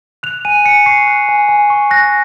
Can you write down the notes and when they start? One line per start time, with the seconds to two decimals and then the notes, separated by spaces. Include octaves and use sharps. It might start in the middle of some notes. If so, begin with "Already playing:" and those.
0.23 F#6 F7
0.45 G#5 D#7
0.65 G#5 C#7
0.86 C#6 C7
1.07 F#6
1.29 G#5
1.49 G#5
1.70 C#6
1.91 F#6 A#6